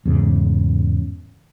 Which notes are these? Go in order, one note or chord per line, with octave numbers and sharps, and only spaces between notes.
E2 G#2 C#3